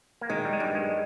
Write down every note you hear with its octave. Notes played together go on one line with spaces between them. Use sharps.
A#3
D#3 G#3
G3
G#3
G2 G3
G#3